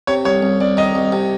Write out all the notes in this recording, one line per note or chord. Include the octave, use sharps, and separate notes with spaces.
C3 C#5
C2 C#5
C2
C2 D5
D#3 D#5
C2
C3